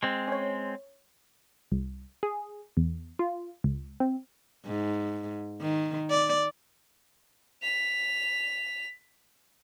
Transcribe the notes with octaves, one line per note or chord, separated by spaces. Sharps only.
G#3 C4
C#4 C#5
C2
G#4
E2
F4
C#2
C4
G#2
D#3
D5
B6 F7